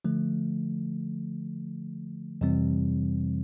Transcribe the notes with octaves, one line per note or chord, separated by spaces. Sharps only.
D3 F3 A3
F2 C3 E3 G3 C4